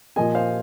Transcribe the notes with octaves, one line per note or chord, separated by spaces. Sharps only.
A#2 F3 A#3 D#5 G#5
C5 F5